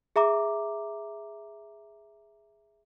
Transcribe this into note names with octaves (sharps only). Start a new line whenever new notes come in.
G#4 E5 A#5 D6